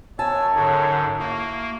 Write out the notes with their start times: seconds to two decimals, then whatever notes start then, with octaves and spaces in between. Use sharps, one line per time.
0.19 F#2 C#5 G#5 A5 E6
0.56 G#2 D3 G#4
1.19 A#3 E4 F#4